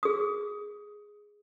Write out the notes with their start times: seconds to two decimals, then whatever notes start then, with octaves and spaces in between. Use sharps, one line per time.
0.03 G#4 D#6